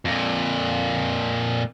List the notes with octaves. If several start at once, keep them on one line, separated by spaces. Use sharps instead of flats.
F2 A#2